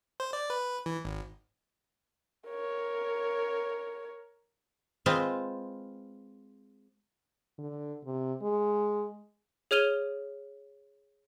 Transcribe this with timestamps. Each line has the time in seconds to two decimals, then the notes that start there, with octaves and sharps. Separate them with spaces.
0.20 C5
0.33 D5
0.50 B4
0.86 E3
1.05 G#1
2.47 A#4 C#5
5.06 G#3 C4 F4 B4
7.58 D3
8.05 C3
8.42 G#3
9.71 G#4 C#5 F6 D#7 F7 G7